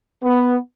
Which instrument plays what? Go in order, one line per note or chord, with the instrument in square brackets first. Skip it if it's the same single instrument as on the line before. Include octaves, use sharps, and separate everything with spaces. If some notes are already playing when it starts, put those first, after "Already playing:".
[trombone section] B3